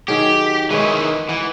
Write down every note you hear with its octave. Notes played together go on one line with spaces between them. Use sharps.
D#3 F#3 G4 G#4
D#3 E3 G#3 C#5
E3 F#5